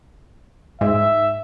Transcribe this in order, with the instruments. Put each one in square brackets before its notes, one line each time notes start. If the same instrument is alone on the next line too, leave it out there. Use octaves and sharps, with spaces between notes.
[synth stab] G#2 [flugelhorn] E5